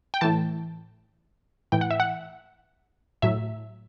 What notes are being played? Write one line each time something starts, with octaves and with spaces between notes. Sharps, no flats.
G5
A2 E3 A5
A2 E3 G5
F#5
E5
F#5
A2 F#3 E5